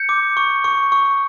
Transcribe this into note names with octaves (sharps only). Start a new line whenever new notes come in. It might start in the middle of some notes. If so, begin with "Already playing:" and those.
Already playing: G6 C#7
D6
C#6
C#6
C#6